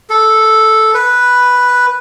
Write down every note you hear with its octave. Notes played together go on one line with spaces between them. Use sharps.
A4
B4